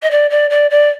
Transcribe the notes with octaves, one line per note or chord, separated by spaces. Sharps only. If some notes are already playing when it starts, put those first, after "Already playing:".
D#5
D5
D5
D5
D5